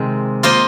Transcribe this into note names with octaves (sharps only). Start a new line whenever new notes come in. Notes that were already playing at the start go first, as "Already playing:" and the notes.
Already playing: C3 D#3 G#3 C4
A#3 F4 C5 D#5